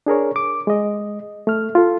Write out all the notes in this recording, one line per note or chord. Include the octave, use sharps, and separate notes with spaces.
D4 G#4 A#4 C#5
D6
G#3 D#5
A3 F6
F4 A4